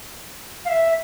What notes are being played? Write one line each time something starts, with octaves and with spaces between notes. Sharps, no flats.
F5
E5